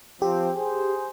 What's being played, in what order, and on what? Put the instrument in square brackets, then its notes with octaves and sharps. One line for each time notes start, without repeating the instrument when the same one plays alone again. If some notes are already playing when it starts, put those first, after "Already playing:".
[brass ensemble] F3 C4 [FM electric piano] G4
[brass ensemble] G#4 C5